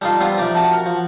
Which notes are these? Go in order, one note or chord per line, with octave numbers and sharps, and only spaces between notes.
G3 D#4 F4 A4 D#5 F5
G3 B3 C4 F4 F5
C3 F3 D#4 D5
F#4 F#5 A5
A#4
F3